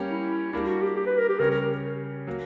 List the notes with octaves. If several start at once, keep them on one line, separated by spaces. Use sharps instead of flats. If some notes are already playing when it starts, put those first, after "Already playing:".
Already playing: G3 A#3 C#4 G4
E4
G3 A#3 D4 E4
F#4
G4
G4
B4
A#4
G4
C#3 G3 C#4 G4 A#4 C#5
A#4
A#4
F#3 A#3